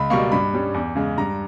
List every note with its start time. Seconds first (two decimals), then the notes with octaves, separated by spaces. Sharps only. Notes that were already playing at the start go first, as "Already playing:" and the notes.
Already playing: C#2 B5
0.10 B2 G3 A#3 C#6
0.32 G2 B5
0.53 G3 C#4
0.74 E2
0.96 C#3 G#3
1.18 G2 A#5